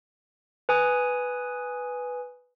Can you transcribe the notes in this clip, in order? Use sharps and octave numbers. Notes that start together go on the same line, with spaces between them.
B4 G#5 D#6